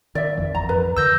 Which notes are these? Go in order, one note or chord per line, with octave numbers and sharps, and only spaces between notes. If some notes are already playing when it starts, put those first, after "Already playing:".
D#3 D5 E5
G1 F2 E3
G#1 F2 A#5
F2 B4
D#2 D3 E3 E6 G6 A#6